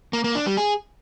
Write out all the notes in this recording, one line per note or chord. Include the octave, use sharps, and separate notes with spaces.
A#3
A#3
D4
G3
G#4